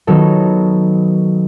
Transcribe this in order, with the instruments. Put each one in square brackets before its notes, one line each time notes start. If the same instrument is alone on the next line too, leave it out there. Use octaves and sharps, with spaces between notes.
[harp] D#3 F#3 B3 D#4 A4